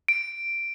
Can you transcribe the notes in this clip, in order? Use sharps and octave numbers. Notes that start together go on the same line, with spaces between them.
D7